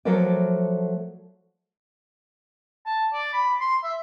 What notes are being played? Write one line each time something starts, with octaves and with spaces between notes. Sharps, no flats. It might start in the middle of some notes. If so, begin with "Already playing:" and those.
F3 F#3 A3 A4 A#4 D5
A5
D5
B5
C6
E5